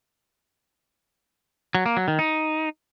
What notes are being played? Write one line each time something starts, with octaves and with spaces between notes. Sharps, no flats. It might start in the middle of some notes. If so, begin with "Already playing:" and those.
F#3
A#3
F#3
D#3
D#4